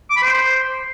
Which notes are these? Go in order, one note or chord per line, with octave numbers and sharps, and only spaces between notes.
D6
B5
C5